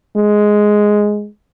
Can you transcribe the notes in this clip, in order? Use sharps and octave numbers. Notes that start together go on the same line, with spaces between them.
G#3